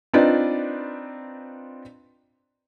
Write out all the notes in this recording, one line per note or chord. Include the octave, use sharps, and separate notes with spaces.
C4 D4 D#4 F4 B4 D5